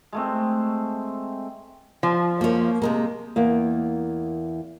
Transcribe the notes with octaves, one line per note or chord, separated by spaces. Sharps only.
G#3 A3 C4
F3
A#3 C#5
C3 G#3 A#3
E2 A#3